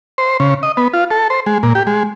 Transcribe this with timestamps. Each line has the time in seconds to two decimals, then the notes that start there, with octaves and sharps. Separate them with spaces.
0.18 C5
0.40 C#3
0.63 D#5
0.77 B3
0.94 F4
1.11 A4
1.30 C5
1.46 G#3
1.63 A#2
1.75 G4
1.87 G#3